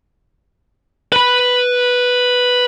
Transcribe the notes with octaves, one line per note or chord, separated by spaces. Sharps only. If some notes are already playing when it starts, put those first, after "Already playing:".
B4 B5